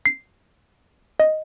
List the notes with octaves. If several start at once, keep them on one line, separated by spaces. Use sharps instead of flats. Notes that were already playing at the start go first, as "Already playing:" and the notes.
C7
D#5